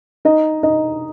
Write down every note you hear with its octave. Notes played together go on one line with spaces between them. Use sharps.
D#4 D#5
D#4 D#5